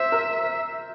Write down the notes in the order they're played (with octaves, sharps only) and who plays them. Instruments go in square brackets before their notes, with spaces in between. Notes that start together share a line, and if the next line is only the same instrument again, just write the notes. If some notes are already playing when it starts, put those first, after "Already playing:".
Already playing: [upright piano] C5 [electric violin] E5
[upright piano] A#4